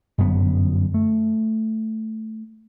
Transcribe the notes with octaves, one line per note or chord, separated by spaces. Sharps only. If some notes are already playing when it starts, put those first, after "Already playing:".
G1 F#2 B3
A3